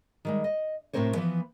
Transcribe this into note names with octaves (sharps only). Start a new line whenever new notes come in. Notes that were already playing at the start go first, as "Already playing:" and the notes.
D#3 G3 G#3
D#5
A2 C3 C4 A#4 C5 C#5
E3 F3 B3